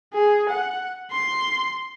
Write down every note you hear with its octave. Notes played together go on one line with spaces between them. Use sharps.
G#4
F#5
C6